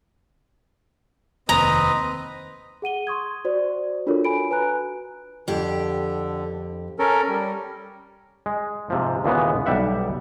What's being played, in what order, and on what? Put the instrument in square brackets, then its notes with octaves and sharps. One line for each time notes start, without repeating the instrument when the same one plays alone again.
[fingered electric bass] F1 D#2 [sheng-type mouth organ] C4 B4 D#5 [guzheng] A#5
[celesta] G#4 F#5 D#7 G7
C6 C#6 D#6 G#6
F#4 C5 D5
D4 F4 F#4 A4 A#4 C#5
G#5 B5 D7
F#4 B4 G#5 A#5 F#6
[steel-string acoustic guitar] F2 G4 [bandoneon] D3
[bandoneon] C#4 A4 A#4
G3
[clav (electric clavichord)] G#3
G#2 C3 F3
D#2 A#2 C#3 E3 G#3 B3
B1 G3 G4 E5 F#5